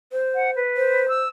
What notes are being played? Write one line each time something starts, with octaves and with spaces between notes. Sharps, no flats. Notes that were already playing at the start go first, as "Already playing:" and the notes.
C5
F#5
B4
C5
E6